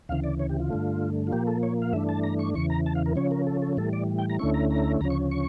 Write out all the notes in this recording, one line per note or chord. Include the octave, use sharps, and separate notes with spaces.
D2 C#3 E3 F5
D5
C#5
G4
F4
G2 D3 A3
F4
A#2 F3 A#3 G4
A4
C#5
F5
G2 E3 A3 D4 E5
A5
A#5
C#6
E2 C#3 E3 C#6
A#5
A5
F5
A#4
C#3 F3 C#4 C#5
A#4
A4
A4
A2 E3 G3 A4
D5
G5
A#5
D2 D3 A3 C#4 E4 C#6
A#5
A#5
D2 C#3 F3 C#4 A#5
C#6
C#6